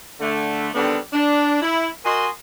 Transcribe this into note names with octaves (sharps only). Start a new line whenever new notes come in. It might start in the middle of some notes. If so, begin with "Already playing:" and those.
D3 A3
D3 D#3 G3 B3 C4 D4
D4
E4
F#4 A#4 D#5 G#5 C6